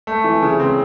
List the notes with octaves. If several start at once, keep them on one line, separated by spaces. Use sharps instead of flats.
A3
E3
C#3
C4